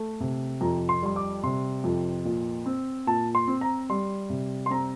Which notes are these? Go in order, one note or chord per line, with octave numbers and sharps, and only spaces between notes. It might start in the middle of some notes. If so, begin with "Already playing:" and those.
Already playing: A3
C3
F2 A#5
C6
G3 C6
D6
C3 C6
F2
A#2
C4
A#2 A5
C6
C4
A#5
G3 C6
C3
C6
C4 A#5